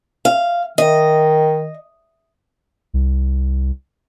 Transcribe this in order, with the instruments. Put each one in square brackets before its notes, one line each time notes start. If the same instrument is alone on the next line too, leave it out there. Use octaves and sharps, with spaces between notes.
[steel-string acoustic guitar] F5
[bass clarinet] D#3 [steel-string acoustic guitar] D#5
[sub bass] C2